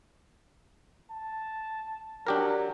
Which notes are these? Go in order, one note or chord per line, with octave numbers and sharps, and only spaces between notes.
A5
F#3 D4 G4 A#4